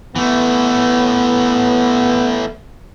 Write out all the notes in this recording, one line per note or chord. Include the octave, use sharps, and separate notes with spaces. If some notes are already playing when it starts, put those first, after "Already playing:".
E3 A3 B3